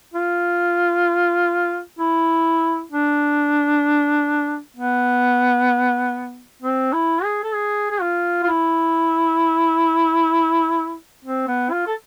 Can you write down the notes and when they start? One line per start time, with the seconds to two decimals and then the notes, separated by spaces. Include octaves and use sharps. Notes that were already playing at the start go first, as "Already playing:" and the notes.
0.14 F4
1.99 E4
2.91 D4
4.76 B3
6.62 C4
6.93 E4
7.24 G#4
7.43 A4
7.54 G#4
7.91 G#4
8.01 F4
8.43 F4
8.46 E4
11.25 C4
11.48 B3
11.71 F4
11.87 A4